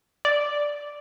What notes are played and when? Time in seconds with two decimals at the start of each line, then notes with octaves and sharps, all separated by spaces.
0.25 D5